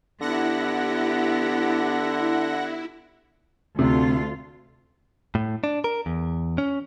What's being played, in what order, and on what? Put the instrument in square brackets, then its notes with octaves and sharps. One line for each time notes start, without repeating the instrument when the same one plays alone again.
[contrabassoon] D3 [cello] B3 G4 [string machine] E4 [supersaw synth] F#5 A#6
[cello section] D2 F4 [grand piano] C3
[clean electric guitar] A2
D4
A#4
E2
C#4